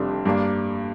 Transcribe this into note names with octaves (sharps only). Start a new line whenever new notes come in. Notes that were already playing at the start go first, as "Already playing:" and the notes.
Already playing: F1 F2 C3 G3 D4
G2 G3 A#3 D4